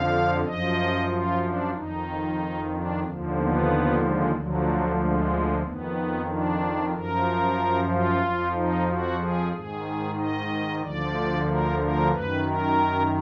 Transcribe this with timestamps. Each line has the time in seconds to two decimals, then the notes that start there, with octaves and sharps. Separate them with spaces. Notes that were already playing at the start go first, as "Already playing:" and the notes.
Already playing: F2 D3 F3 F5
0.45 F#2 F3 D#5
1.10 F4
1.41 D4
1.73 F2 D#3 D#4
2.71 D4
3.03 D#2 D3 F3
3.37 B3
4.00 G#3
4.33 D2 D3 F3 F#3
4.98 G#3
5.63 F2 D#3 B3
6.27 D4
6.93 F#2 F3 A#4
7.90 F4
8.23 F2 F3
8.55 D#4
8.88 F#4
9.19 G#4
9.52 G#2 D#3 G#4
10.17 D#5
10.82 D2 D3 F3 D5
11.47 A#4
11.79 A#4
12.11 F#2 D#3 B4
12.44 A#4